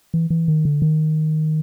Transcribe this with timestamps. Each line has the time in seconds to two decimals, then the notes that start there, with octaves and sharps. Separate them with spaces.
0.14 E3
0.30 E3
0.48 D#3
0.65 D3
0.82 D#3